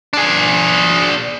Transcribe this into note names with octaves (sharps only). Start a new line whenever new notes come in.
D4 G#4